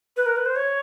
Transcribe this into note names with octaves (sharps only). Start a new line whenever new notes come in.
B4
A#4
B4
C5
C#5